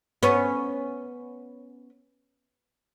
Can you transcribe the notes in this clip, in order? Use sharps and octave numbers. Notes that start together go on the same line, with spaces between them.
B3 C#4